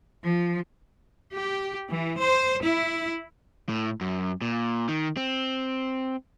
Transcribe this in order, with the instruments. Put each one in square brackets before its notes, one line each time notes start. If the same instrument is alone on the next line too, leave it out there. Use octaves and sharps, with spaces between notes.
[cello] F3
[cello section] G4
E3
C5
E4
[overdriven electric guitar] A2
F#2
A#2
D#3
C4